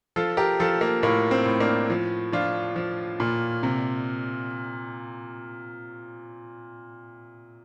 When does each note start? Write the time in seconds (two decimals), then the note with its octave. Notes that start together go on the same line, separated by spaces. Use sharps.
0.16 F3 F4 A4
0.37 G4 A#4
0.60 F3 F4 A4
0.81 A#3
1.03 A2 A#3
1.31 C4
1.45 A2
1.60 A#3 D4
1.90 F3
2.32 F3 D4 F4
2.76 F3
3.20 A#2
3.63 C3